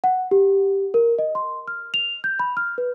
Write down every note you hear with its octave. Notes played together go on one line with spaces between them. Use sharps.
F#5
G4
A#4
D#5
C6
F6
F7
G6
B5
F6
B4